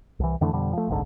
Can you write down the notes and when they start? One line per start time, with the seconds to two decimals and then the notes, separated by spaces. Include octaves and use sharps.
0.20 C2 E3
0.41 F2 D3 E3 A3
0.53 F2 B2 D3 G3
0.73 F3 A3
0.88 F#1 C2 G#2 D3